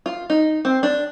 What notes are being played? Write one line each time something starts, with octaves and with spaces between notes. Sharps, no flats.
F4
D#4
C4
D4